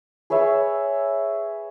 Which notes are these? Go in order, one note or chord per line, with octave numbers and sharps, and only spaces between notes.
G#4 B4 C#5 E5